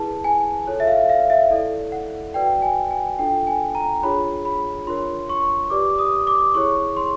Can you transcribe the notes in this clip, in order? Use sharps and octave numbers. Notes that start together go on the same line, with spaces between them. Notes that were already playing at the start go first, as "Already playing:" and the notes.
Already playing: E4 G#4 B4 A5
G#5
F4 A4 C#5
E5
F5
F5
E5
E4 A4 D5
F#5
F#4 B4 D5 G5
G#5
G#5
D4 F4 A4 G5
G#5
A#5
D4 F4 G#4 C#5 B5
B5
D4 F4 A#4 C#5 C6
C#6
G4 B4 D5 D6
D#6
D6
E4 G#4 C#5 C#6
C6